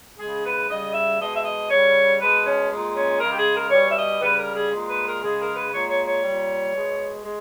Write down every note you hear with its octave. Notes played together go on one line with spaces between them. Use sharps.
C#3 G#3 G#4
B4
C#3 G3 D#5
E5
B2 G#3 D#5
E5
D#5
C#3 G3 C#5
B2 G#3 B4
C#4
A#2 G#3
C#4
C#3 G#3 A#4
G4
G#4
A#4
B2 G3 C#5
E5
D#5
C#3 G3 B4
A#4
G#4
A#2 G#3
B4
A#4
C#3 G#3 G#4
A#4
B4
A#2 G#3 C#5
C#5
C#5
A#2 G3
B2 G#3
G#3